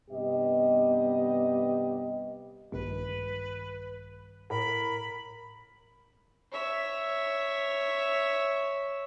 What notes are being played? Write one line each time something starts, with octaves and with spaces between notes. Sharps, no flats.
G2 C3 B3 G4 D#5
A#1 G2 D#3 B4
A2 A#4 B5
C#5 E5